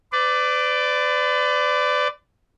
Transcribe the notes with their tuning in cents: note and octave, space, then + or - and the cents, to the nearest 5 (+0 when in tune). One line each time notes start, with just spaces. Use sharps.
B4 +40 D5 +0